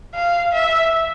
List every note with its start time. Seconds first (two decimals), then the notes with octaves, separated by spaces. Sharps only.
0.15 F5
0.53 E5